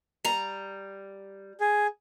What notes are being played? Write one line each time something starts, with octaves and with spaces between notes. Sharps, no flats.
G3 A#5
G#4